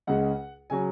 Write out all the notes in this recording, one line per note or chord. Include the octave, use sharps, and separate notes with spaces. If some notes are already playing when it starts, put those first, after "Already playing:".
C#2 C#3 G#3 F#5
C#3 F#3 G#5